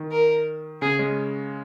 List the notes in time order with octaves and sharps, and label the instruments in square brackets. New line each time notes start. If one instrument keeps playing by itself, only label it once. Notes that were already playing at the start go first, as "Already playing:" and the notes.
Already playing: [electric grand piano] D#3
[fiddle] A#4
[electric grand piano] C#3 [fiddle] G#4
[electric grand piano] G#3 C#4